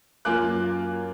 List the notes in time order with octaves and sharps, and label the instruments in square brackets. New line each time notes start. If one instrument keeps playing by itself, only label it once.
[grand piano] F#2 A#3 F4 G#5 D6 F#6